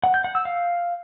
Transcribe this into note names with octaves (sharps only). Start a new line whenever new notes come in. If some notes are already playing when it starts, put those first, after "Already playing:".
F#5
G6
F#5
E6
F5